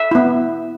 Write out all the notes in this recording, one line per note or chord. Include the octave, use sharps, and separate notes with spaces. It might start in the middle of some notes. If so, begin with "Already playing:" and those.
Already playing: E5
B3 E4